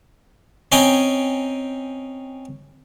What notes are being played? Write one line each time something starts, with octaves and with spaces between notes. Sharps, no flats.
C4 C#4 D#5 G5 G#5 A#5